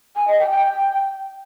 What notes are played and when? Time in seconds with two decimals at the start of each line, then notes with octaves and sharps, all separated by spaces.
0.16 G#5
0.28 D#5
0.39 G5
0.51 G5